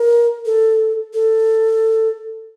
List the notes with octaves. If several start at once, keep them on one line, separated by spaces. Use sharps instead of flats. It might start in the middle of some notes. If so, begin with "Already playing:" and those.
Already playing: A#4
A4
A4